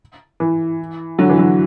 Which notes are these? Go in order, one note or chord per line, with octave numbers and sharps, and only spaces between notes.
E3
D3 F#3
E3
D3 F#3